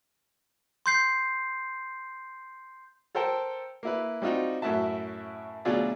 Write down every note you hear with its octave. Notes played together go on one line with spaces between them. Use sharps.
C6 G6 C7
A4 A#4 C5 G5 A5
A#3 E4 B4
G3 C4 D#4 F4 F#4
F#2 A2 F#4 E5 A5
D2 B2 F#3 F4 G#4 D5